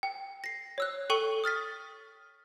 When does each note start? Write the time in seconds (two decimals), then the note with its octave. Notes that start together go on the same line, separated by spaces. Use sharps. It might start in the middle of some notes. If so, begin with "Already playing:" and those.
0.03 G5
0.44 A#6 C7
0.78 C#5 E6 F#6
1.10 A4 G5 C#6 D#7 G7
1.44 D#6 F6 A6 B6